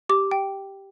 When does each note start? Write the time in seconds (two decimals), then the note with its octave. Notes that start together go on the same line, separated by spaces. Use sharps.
0.09 G4 D6
0.31 G5